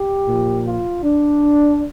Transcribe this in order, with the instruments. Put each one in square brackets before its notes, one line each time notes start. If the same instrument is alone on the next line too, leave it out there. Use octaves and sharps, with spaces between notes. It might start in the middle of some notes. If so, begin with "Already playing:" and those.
Already playing: [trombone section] G4
A#2 F3
F4
D4